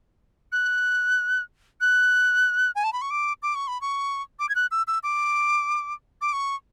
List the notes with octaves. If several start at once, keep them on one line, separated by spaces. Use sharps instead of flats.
F#6
F#6
G#5
A5
B5
C#6
D6
D6
C#6
B5
C#6
D6
G#6
F#6
E6
E6
D6
D6
C#6